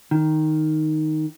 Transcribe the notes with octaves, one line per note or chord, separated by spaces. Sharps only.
D#3